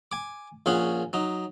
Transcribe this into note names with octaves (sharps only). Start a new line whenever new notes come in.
G#5 D6
A#1 A#2 C#4 G#4 F#5
F#3 D#4